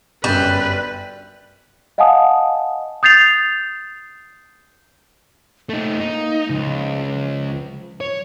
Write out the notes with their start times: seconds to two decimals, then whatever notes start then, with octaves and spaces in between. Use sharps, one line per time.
0.24 G1 F#2 G3 B4
1.98 D#5 F5 F#5 G#5 A5 D#6
3.03 D#6 G6 A6 C7 F7
5.69 A3 A#3 D#4
6.00 A#3 D#4
6.50 C#2 F3
7.18 F3
8.01 C#5